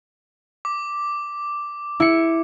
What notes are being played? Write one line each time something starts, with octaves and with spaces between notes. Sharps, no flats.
D6
E4 C#7